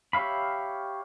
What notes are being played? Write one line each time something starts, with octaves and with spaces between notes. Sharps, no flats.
G4 C#5 E5 F5 B5